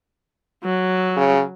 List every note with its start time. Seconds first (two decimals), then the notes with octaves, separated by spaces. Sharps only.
0.64 F#3
1.16 C#3